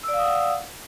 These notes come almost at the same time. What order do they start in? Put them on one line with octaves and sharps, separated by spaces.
E6 D5 F5 D#6 F#5